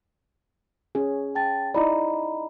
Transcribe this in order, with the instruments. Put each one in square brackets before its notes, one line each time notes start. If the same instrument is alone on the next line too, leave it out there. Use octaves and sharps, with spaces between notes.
[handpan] C#4 G#4
[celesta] G5 A5 A6
[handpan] D#4 E4 D5 [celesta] D#5 A#5 B5